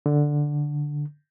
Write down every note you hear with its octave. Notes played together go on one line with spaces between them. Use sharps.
D3